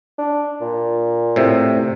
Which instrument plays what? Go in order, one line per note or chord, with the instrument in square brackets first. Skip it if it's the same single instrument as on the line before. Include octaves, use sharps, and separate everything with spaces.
[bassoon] D4
A#2
[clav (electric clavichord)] A2 C3